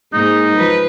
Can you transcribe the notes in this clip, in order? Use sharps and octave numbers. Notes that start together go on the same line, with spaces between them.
G#2 G#3 A#3 D#4
F3 B4